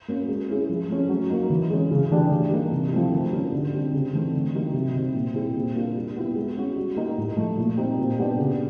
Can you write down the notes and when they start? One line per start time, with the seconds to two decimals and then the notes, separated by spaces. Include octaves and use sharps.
0.08 A#3 C#4 F#4
0.28 G#3
0.49 C#4 E4 G#4
0.69 F3
0.90 A3 C#4
1.09 F#3
1.30 A#3 D#4
1.50 E3
1.70 G#3 C#4
1.91 C#3
2.11 E3 A3 D4 G4
2.32 E3
2.51 G3 A#3 D#4 G4
2.72 C3
2.92 F3 A3 C4 E4
3.12 D#3
3.32 G3 A#3 C#4
3.52 D3
3.73 G3 C4
3.93 C#3
4.13 E3 A3 C4 D#4
4.33 D3
4.54 F#3 A#3 D#4 G4
4.74 C3
4.94 D#3 G3 C4
5.14 A#2
5.34 G3 C4 E4 G#4
5.55 A#2
5.75 G3 A#3 D4 F4
5.96 G3
6.16 B3 E4 G4
6.35 G#3
6.57 C#4 F#4
6.76 G3
6.96 A#3 D#4 G4
7.18 A2
7.37 F3 A3
7.58 A#2
7.77 G3 C4 D#4
7.99 A#2
8.19 G3 B3 D4 G4
8.39 C#3